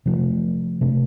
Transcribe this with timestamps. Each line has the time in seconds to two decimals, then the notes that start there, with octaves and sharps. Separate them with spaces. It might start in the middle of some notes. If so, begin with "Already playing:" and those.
0.06 C3 F3 A3
0.81 C3 A3 D4